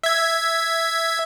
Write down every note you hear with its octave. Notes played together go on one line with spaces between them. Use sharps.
E5 G#6